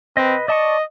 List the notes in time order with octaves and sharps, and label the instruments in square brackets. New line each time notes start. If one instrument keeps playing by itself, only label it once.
[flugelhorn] C4 [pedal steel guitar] B4 D#5
[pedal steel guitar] D5 A5 C#6 [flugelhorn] D#5